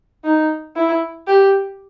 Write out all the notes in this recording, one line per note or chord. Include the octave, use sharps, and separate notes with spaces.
D#4
E4
G4